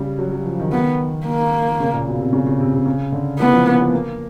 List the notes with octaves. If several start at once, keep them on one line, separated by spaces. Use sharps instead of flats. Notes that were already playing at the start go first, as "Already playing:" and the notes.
Already playing: C#3 G3
F#3
F#3
F3
D#3
D#3 B3
A#3
C#3
A#2
B2
C3
C#3
C#3
C3
C3
C#3
D3
E3 B3
F3
A#3
B3
A#3